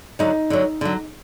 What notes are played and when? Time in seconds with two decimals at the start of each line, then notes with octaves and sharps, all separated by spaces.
0.19 D3 F#3 D#4
0.50 D3 F#3
0.81 D3 F#3